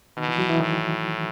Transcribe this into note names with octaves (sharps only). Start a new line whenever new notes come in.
B2 D#3 D#4
E3 E4
F#3 F#4
E3 E4
A2 D#3 D#4